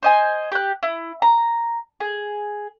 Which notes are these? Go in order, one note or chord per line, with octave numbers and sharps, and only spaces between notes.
C5 D#5 G#5
G4 F#6
E4
A#5
G#4